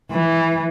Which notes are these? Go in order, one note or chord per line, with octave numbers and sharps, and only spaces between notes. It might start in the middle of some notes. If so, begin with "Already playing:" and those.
E3